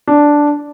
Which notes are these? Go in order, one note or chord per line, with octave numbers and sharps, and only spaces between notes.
D4